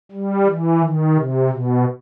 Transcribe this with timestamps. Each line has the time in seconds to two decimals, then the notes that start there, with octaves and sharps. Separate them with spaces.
0.12 G3
0.46 E3
0.81 D#3
1.15 C3
1.49 B2